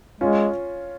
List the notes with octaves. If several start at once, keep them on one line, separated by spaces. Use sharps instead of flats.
G#3 C#4 F4